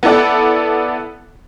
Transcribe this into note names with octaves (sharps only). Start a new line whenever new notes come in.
B3 E4 A4 D5 F#5